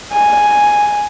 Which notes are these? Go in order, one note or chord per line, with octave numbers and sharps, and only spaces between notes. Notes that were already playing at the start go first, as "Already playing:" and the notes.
G#5